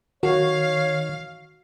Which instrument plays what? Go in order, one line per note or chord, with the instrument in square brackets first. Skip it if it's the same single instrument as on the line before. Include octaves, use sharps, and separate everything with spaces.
[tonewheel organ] D#3 [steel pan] F#4 [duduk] C#5 [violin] F5